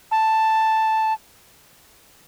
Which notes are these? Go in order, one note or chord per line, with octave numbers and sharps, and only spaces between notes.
A5